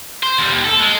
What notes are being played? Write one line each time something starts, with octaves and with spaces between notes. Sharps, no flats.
C5
D#2 G3
D#2
A4
G#3